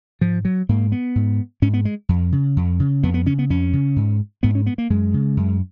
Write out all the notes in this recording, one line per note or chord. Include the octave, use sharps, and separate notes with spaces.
G#2 F3
F#3
G#2 A#3
B3
G#2
G#2 C#4
B3
G#3
F2
C#3
F2
C#3
F2 B3
B3
C#3 C#4
B3
F2 C#4
C#3
G#2
G#2 B3
C#4
B3
A#3
F#2 G#3
C#3
F#2